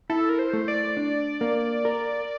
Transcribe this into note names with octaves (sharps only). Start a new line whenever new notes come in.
E4 A4
A#4
C5
A3
D5
D4
A#3
A#4